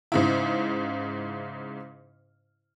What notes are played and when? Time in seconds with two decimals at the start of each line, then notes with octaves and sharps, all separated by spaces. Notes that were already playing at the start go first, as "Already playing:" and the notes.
0.12 G#2 C#3 E4